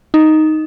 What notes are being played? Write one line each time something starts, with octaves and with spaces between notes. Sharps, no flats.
D#4